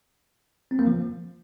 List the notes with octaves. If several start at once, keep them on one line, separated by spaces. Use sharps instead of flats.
C4
A#3
F3